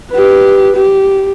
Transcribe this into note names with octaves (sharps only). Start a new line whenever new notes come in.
G4 B4
G4